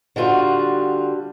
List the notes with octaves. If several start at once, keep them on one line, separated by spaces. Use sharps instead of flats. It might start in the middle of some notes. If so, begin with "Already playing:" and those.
D3 G3 F4 F#4